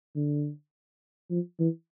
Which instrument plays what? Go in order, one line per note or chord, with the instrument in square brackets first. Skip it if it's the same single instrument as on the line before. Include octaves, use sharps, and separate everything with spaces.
[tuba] D3
F3
E3